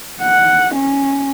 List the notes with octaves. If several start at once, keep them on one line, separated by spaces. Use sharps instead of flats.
F#5
C#4